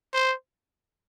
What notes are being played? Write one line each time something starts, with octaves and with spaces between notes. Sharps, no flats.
C5